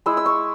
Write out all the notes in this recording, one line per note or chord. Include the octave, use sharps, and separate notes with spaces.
G#3 E4 E6
E6
C#6